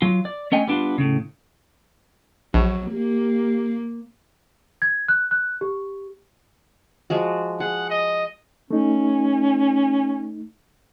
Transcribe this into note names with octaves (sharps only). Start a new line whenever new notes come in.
F#3 F4
D5
A3 C#4 D#5 G5 G#5
G3 B3 D4 D#4 F4
A2 C#3
A#1 F#3
A#3 G4
G#6
F#6
F#6
G4
F3 G#3 F#4
G#4 F#5
D#5
A3 C#4 D#4